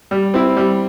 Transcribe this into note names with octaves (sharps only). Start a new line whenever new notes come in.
G3
C4 E4
G3